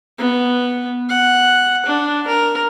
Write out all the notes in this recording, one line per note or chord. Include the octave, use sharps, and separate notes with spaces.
B3
F#5
D4
A#4